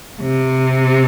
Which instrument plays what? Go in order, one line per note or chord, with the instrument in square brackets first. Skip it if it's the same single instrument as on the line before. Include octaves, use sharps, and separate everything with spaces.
[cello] C3